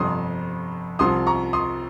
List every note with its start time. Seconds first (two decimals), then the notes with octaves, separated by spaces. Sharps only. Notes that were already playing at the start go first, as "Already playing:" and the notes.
Already playing: G1 F2 C3 C6 D#6
0.99 C2 C3 F3 C6 D#6
1.27 A#5 C#6
1.53 C6 D#6